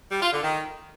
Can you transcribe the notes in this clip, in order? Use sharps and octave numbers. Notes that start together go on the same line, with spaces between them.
G3
F4
D3
D#3